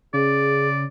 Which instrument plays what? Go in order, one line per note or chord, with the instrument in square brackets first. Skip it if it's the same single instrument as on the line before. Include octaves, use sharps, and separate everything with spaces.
[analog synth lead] C#3 [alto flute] G#4 [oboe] D5